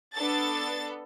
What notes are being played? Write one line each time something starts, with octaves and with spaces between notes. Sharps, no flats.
B3 D4 A4 A6